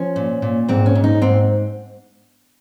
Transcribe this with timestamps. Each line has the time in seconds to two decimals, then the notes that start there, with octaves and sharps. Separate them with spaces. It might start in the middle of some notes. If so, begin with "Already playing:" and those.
Already playing: F3 C#4
0.16 A#2
0.42 A#2
0.68 G#2 C4
0.86 C#4
0.95 G#2
1.04 D#4
1.21 G#2 C4